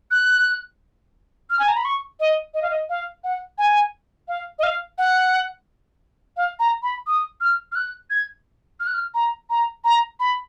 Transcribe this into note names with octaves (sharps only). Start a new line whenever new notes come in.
F#6
F6
G#5
A#5
B5
C#6
D#5
D#5
F5
D#5
F5
F#5
G#5
F5
D#5
F5
F#5
F5
A#5
B5
D#6
F6
F6
F#6
G#6
F6
F#6
F6
A#5
A#5
A#5
B5